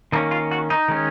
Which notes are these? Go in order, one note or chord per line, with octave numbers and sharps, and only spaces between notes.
D#3 A#3 C#4 D#4
F4
F#4
D#4
D#3 G#3 C#4